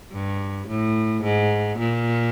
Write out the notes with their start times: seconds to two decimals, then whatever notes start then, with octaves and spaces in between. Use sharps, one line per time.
0.12 G2
0.68 A2
1.22 G#2
1.78 A#2